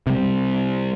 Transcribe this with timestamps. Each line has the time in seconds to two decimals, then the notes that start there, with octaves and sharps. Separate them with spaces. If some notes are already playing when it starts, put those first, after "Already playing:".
0.07 C3 G3